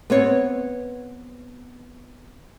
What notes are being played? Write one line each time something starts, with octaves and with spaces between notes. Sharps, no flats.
B3 C4 C#5